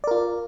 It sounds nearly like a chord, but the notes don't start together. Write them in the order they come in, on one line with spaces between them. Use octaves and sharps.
D5 A#4 F4